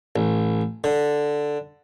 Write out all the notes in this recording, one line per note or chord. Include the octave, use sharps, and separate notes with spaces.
A1
D3